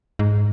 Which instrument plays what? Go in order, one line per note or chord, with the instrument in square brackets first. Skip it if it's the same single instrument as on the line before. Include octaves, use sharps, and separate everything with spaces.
[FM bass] G#2